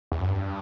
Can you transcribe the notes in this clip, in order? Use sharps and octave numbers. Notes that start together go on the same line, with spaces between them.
E2
F#2
G2